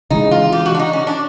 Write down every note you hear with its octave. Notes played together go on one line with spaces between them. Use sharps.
C#3 E3 G#3 D#4
F4
G4
F#4
D4
D#4
C#4
D4